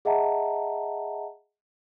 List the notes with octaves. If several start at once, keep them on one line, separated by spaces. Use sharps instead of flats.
G#4 D#5 E5 F#5 A5 A#5